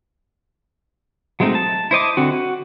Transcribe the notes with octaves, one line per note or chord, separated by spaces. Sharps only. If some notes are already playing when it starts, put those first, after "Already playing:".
F#3 G#3 A3 C4 D#4
A5
E4 C5 D#5 D6
D3 C4 F#4
F#4